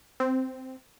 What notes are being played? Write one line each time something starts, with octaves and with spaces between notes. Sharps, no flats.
C4